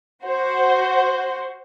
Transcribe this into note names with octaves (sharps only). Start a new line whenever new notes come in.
F#4 C5